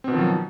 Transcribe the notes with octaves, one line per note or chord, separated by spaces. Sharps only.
B2 D#3 F3 F#3 C4